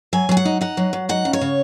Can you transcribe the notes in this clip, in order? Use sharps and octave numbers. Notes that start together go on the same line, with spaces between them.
F#3 G#5
F#3 G#5
F#5
D#4
D#4 F#5
F#3
F#3
D#4 F#5
C#3
C#5
C#3